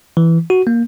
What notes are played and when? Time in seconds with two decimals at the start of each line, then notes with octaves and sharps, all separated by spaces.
0.17 E3
0.50 F#4
0.67 A#3